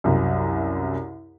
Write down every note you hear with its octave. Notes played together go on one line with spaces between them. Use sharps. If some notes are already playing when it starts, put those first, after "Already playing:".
C2 F#2